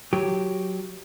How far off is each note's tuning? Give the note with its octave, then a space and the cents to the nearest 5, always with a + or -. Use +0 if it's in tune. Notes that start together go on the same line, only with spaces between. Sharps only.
F#3 +0 G4 -5